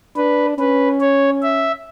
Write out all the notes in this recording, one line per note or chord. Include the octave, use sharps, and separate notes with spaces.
D4 B4
C#4 B4
C#5
E5